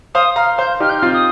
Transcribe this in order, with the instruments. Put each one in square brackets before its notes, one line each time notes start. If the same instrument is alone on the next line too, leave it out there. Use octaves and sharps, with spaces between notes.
[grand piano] C5 F5 [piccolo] D#6
[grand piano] F5 A#5 [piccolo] F6
[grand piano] C5 F5 [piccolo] G6
[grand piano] D#4 G4 [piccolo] F6
[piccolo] G6
[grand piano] C4 F4 [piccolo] F6
[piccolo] D#6